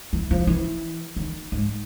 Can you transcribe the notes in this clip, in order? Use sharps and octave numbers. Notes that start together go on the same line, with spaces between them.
E3
F3
E3
D#3
G#2